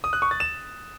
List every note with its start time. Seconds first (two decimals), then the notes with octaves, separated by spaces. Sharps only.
0.04 D#6
0.13 F#6
0.22 C#6
0.31 A6
0.40 E7